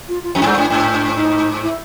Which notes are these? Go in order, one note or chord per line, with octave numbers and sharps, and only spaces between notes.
F4
F4
F2
G#2
G2
G#2 D4
G#2 D4
D4
D#4
E4